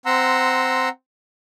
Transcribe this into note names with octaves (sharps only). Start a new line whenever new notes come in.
C4 F#5 A#5 C6 E6